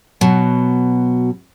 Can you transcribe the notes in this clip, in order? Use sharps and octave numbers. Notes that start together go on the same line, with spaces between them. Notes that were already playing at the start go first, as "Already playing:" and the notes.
B2 F#3